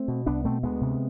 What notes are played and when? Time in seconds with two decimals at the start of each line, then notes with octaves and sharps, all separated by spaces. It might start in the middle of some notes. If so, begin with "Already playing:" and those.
Already playing: A3 C4
0.08 B2
0.26 C2 B3 D4
0.45 B2 A3 C4
0.63 D2 G#3 B3
0.81 C3